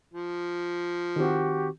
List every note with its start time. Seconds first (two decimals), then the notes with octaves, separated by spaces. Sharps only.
0.14 F3
1.16 D#3 C4 F#4 G4